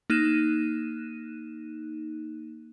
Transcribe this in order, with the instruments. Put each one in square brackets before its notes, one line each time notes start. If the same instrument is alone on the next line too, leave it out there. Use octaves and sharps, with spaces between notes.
[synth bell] A#3 D#4 F#6 D#7 E7